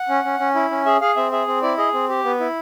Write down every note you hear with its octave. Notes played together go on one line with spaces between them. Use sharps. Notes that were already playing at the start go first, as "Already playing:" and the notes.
Already playing: F#5
C#4
C#4
C#4
E4
C#4
G#4 E5
G#4 F5
C4 E5
G#4 E5
C4
E4 D5
G#4 D#5
C4
G4
B3
E4